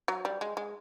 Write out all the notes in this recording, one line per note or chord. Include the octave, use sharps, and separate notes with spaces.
F#3
G3
G#3
G#3